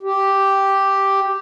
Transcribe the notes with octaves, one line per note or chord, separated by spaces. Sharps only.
G4